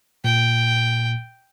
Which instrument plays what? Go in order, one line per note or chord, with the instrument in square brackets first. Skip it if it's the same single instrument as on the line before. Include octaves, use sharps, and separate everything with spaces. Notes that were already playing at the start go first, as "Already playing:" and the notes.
[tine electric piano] A#2 [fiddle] G5